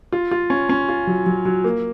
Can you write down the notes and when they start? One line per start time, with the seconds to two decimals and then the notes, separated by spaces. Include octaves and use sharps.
0.12 F4
0.31 F4
0.50 C#4
0.69 C#4
0.89 F4
1.07 F#3
1.26 F#3
1.45 F#3
1.64 A#3